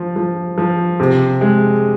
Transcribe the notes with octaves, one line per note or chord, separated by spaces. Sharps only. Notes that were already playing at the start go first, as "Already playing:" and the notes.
Already playing: F3
F3
F3
C3
G#3